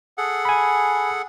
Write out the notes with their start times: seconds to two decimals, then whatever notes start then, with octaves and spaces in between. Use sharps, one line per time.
0.18 G#4 A4 F#5
0.45 G#5 B5